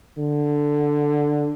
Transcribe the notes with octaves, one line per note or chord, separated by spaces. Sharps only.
D3